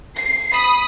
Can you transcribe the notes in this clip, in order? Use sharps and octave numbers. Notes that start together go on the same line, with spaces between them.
C7
B5 D#6